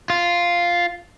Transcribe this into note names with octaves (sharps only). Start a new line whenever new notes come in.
F4